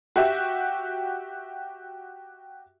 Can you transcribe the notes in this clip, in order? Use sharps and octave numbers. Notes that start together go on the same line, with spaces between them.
F#4 G4 E5